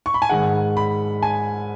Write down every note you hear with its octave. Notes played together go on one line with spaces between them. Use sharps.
C#6
B5
G#5
G#2 D#3 G#3 F#5
B5
G#5